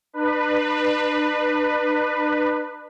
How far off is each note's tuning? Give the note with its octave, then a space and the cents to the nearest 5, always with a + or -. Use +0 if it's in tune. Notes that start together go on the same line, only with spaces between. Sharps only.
D4 +45 B4 +0